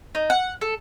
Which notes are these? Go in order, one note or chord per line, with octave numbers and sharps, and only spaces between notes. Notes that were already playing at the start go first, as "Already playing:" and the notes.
D#4
F#5
A4